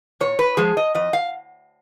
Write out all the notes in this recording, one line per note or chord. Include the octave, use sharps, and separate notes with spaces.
A#2 C#5
B4
F3 G#3 G#4
D#5
F2 D#5
F5